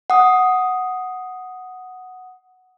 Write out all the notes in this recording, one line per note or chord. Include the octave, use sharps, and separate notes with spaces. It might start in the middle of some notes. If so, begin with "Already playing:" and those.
F#5 D#6